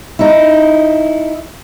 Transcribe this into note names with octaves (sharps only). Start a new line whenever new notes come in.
D#4 E4